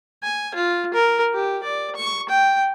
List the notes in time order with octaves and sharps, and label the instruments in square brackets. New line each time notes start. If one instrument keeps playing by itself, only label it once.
[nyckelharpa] G#5
F4
A#4
G4
D5
C#6
G5